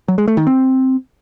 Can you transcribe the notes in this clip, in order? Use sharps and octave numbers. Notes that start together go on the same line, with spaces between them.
F#3
G#3
A3
D#3
C4